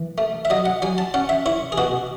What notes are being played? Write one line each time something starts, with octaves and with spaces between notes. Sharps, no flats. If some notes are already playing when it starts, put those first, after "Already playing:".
Already playing: E3
A3
E5
F#3 D#5
F#5
F#3 G#5
A5
C#4 F#5
E5
E4 C#5
G#4
B2 F#4